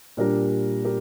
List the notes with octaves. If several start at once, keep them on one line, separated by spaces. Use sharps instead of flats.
A#2 G3 D4 G4 A#4
G4 A#4